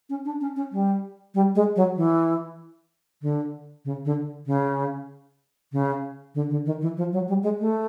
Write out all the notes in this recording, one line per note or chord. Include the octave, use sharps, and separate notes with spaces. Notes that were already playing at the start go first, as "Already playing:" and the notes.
C#4
D4
C#4
C#4
G3
G3
G#3
F#3
E3
D3
C#3
D3
C#3
C#3
D3
D3
D#3
E3
F3
F#3
G3
G#3
A3